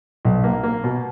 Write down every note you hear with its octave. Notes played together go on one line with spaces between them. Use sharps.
B1
A#3
A#3
B2